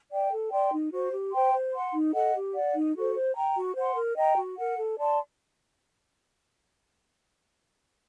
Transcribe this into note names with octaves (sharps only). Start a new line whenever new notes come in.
D5 G5
A4
D5 G5 C6
D#4
F#4 C5
G4
C5 G5 C6
C5
F#5 C6
D#4
A4 D#5 F#5
G4
D5 F#5
D#4
F#4 A4 C5
C5
G5 A#5
F#4
C5 F#5 C6
A#4
D#5 G5 A#5
F#4
A#4 F#5
A4
D5 A5 C6